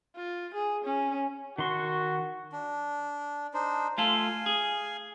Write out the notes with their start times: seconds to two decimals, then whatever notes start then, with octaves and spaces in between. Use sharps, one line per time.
0.16 F4
0.54 G#4
0.84 C#4
1.58 D#3 F#4 C6 C#6
2.52 D4
3.54 D4 D#4 C5
3.98 A3 F4 A4 F5 G#5
4.46 G#4